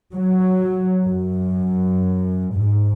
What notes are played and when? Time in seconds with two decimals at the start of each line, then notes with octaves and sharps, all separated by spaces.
0.14 F#3
1.06 F#2
2.56 G#2